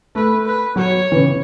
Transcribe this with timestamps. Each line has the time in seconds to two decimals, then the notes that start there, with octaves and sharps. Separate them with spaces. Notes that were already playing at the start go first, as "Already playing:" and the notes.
0.15 A3 B4
0.45 B4
0.76 F#3 C#5
1.12 E3
1.16 C#3